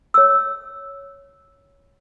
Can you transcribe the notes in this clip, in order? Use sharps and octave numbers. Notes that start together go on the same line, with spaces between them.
C#5 E6